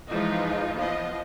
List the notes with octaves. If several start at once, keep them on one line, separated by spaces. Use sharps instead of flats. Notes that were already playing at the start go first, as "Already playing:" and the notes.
E3 F3 G#3 D#4 F4
F3 B3 F4 D#5